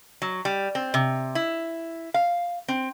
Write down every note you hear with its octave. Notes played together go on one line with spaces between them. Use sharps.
F#3
G3
C4
C3
E4
F5
C4